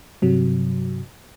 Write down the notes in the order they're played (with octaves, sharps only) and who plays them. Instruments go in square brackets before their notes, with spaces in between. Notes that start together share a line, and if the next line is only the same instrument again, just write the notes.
[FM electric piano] G2 C3 F#3